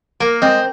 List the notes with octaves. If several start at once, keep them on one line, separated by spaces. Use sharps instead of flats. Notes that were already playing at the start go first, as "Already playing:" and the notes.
A#3 A#4
G#3 C4